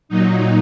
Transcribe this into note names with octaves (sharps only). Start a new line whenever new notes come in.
A#2 F#3 D#4